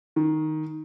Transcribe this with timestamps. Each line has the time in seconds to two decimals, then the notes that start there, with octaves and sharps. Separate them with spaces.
0.16 D#3